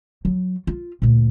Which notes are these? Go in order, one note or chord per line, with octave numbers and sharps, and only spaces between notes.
F#3
F4
D2 A#2